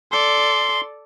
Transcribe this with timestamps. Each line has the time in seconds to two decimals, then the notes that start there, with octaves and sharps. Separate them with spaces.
0.12 A4 D5 C6